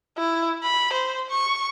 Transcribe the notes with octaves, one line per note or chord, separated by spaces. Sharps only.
E4
B5
C5
C#6